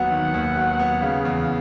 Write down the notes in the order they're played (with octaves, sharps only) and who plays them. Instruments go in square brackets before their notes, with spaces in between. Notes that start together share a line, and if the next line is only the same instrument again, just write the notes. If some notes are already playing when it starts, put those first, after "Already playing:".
Already playing: [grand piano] D#2 D#3 F#3 B3 [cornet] F#5
[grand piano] D#3
D#2
F#3
B3
[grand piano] C#3 [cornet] F5
[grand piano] E2